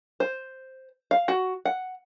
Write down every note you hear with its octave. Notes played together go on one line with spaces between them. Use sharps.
C5
F5
F#4
F#5